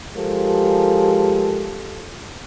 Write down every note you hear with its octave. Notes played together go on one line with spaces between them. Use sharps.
F3 G#3 G4 A4 A#4